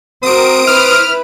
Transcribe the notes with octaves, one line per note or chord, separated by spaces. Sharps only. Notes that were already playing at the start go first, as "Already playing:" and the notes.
C4 F#4 A#4 C5 D#6 D7
E4 B4 F6